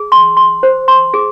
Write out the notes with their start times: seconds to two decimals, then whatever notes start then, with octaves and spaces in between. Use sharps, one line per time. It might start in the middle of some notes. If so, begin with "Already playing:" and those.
Already playing: G#4
0.12 C6
0.37 C6
0.63 C5
0.88 C6
1.14 G#4